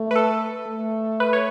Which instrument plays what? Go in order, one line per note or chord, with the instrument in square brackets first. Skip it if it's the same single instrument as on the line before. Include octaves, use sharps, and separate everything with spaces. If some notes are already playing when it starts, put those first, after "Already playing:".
Already playing: [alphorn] A3
[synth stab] B4
A4
[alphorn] A3
[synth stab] B4
C#5